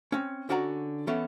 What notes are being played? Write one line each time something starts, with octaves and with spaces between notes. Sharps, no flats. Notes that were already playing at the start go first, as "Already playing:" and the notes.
C4 C#4
D3 C#4 F#4 D5 F#5 A#5
E3 B3 C#4 A4